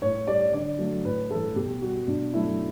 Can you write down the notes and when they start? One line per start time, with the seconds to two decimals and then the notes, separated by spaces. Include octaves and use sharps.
0.02 A2 C#5
0.27 G3 D5
0.53 D3 D5
0.79 F#3 A3
1.05 A2 B4
1.31 E3 A3 A4
1.56 B2 G4
1.82 G3 F#4
2.08 B2 D4
2.33 F#3 A3 E4